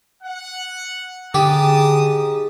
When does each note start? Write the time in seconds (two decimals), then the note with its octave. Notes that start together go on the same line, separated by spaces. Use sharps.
0.23 F#5
1.34 G#2 D3 G4 A5 D6 D#6